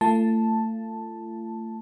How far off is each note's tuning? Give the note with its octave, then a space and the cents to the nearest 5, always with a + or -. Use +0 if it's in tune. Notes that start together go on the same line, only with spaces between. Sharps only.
A3 +25 F4 -40 A5 +0